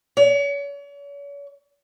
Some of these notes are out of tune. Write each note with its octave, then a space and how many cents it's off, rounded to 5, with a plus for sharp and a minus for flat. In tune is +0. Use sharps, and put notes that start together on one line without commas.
C#5 +40